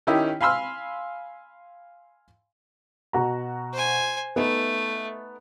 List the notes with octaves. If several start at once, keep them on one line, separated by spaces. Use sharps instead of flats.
D#3 C#4 D#4 E4 G4
F5 G#5 B5 C6 E6 F6
B2 F#4 A#5
C5 G#5
A3 B3 D#4 E5